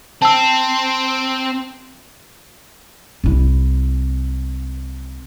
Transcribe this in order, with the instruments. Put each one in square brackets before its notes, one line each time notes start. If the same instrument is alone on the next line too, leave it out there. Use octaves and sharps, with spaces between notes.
[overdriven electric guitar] C4 [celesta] A5 E6
[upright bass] C2 E4